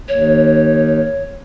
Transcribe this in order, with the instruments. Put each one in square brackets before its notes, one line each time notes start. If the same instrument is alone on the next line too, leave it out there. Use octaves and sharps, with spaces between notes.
[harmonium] D#2 [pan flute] C#5